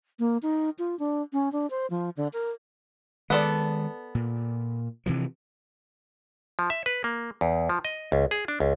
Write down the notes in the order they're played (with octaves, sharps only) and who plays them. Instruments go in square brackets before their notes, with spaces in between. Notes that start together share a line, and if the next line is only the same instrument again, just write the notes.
[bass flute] A#3
D#4
F4
D4
C#4
D4
C5
F3
D3
A#4
[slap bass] D#3 G#3 [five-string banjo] B3 A4 D5
[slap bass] A#2
C3 E3 F3
[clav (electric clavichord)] F3
E5
B4
A#3
E2
F3
D#5
C#2
G#4
D4
C#2